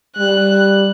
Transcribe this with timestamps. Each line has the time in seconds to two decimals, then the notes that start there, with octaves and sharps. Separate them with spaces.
0.18 G3 F#6